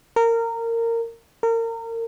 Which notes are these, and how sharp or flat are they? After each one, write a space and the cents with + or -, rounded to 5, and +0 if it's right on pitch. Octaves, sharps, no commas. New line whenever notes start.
A#4 -20
A#4 -30